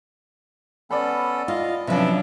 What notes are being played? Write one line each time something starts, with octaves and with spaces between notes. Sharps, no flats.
B3 C#4 A4 D5 B5
F4 D#5 F5
C3 F3 F#3 C#4 D4 B4 E5